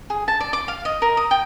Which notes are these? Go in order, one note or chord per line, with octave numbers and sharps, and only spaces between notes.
G#4
A5
D5
D6
F5
D#5
A#4
D#6
G5